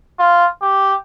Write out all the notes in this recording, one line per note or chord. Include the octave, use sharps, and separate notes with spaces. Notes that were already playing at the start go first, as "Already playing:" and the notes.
F4
G4